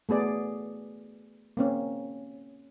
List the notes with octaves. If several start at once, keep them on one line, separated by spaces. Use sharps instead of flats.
A3 B3 G#4 D5
A#3 C4 C#4